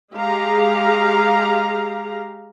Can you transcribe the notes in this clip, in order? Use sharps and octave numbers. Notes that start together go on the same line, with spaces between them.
G#3 G4 G#4 F5 A#5